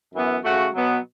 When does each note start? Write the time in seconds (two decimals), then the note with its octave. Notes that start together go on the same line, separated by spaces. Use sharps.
0.14 F#2 E3 B3
0.43 C#3 A3 F#4
0.74 B2 F#3 B3